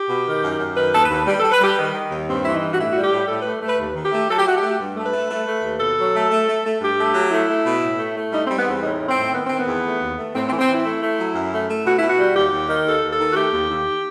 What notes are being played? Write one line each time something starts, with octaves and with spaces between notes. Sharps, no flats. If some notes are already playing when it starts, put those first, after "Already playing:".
Already playing: G4
B2
D#3
F#2
F#2
D#3 B4
D#2 A4
B4
D#2
G3
G3 A4
B4
G3 G4
D#3
D#3
D#2
G2 C4
E3 E4
D#4
G2
F#4
A2 E4
G3 F#4
G4
A2
A2 A4
A3 B4
A3 B4
D#2
D#3
G4
A3
F#3 A4
G4
A3 F#4
G4
A3
G2
A3
B4
A3
A3
A3
D#2
B2 A4
F#3
A3
A3
A3
A3
G2 G4
A3
F#3
A3 E4
A3
B2
A2
A3
A3
G3 D#4
G3 C4
B3
E2 C4
A2 D#4
A2
C4
A2
D#3 B3
D#3 C4
B3
E2
A3
D#2
A3
A2 C4
C4
E3
C4
E3 E4
A3
A3
F#3
F#2
A3
A3
B2 F#4
B2 E4
F#4
G3
D#2 G4
D#2
D#3
D#2 A4
D#2
A4
D#3
F#4
A3 G4
D#2
D#2